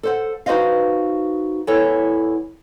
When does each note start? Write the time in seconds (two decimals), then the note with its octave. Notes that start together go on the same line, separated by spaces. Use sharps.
0.03 A4 C5 F#5
0.46 D#4 F#4 B4 C5 D#5 F5
1.67 E2 E4 A4 C#5